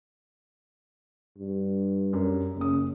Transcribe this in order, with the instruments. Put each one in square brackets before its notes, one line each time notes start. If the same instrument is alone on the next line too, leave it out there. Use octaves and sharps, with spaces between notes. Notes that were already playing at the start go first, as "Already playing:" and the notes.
[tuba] G2
[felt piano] F#2
[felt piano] F#1 D#6 [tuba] C#3